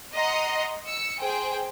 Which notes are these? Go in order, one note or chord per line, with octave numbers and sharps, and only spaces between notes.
D#5 F#5 A#5 C6
E6 C#7
G#4 C5 G5